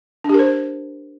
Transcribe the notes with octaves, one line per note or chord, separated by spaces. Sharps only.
D4 G4 A#4 C5